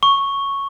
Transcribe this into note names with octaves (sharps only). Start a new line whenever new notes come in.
C#6